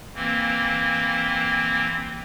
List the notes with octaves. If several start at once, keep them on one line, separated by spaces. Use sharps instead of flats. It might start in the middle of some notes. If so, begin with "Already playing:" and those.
E3 A#3 C4